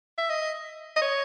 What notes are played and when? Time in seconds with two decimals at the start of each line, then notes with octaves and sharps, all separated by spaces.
0.18 E5
0.30 D#5
0.96 D#5
1.02 C#5